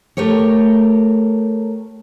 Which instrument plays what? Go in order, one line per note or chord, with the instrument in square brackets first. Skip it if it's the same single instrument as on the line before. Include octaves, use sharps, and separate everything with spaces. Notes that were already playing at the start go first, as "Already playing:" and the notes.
[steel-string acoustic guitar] A3 G4 A#4 C#5